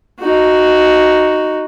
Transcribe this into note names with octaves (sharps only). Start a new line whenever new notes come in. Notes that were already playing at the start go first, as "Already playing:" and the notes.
D#4 F#4